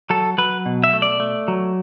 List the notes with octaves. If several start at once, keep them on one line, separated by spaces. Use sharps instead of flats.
F#3 A4
F#3 B4
B2
E5
A3
D5
A3
F#3